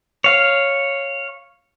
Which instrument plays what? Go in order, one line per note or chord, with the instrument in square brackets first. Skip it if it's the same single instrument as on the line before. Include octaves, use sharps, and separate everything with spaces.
[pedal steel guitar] C#5 F5